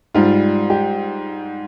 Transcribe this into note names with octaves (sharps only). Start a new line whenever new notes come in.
G#2 G3 F4
G4